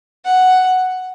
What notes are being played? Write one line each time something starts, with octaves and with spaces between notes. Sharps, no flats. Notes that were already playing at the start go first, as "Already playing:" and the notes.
F#5